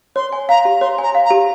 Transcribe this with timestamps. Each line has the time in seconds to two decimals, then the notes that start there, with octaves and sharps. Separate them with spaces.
0.16 C#5 C6
0.33 G#5
0.49 F5 A#5
0.65 G4
0.81 C#5 C6
0.98 G#5 A#5
1.15 F5
1.25 A#5
1.30 G4